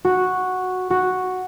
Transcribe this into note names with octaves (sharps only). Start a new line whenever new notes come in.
F#4
F#4